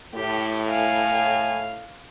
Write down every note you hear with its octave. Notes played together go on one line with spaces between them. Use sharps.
A2 G4
F5 G#5